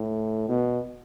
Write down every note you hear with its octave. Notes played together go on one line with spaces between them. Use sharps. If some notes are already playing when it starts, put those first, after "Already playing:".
Already playing: A2
B2